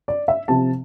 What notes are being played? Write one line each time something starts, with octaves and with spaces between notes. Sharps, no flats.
D5
E5
C3 F3 C4 A5